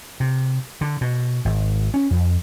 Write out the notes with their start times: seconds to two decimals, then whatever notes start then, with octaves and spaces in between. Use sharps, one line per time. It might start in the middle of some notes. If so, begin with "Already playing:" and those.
0.20 C3
0.81 D3
1.01 B2
1.45 G#1
1.94 C#4
2.11 F2